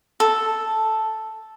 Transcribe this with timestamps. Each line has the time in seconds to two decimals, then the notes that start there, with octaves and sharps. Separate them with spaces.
0.20 A4